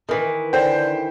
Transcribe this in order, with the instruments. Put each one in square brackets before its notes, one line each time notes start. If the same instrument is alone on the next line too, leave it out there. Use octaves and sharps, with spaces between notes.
[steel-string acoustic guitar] D#3 E3
[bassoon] D3 [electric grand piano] C5 G5